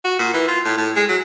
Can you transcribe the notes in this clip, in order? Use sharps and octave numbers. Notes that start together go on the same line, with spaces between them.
F#4
A#2
E3
F4
A2
A2
G#3
F#3